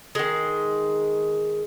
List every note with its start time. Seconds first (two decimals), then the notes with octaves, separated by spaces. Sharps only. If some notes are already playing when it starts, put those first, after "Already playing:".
0.15 D#3 G#3